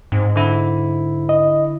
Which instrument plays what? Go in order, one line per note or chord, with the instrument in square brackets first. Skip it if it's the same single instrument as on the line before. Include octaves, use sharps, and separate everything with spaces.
[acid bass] G#2 [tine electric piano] C4
[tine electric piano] D3 E4
[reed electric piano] D#5